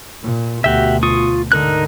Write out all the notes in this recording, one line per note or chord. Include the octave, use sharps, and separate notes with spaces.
A#2
D2 B2 F#4 G4 E5
F4 C#6 D#6
G#2 D3 D#4 A#4 F#6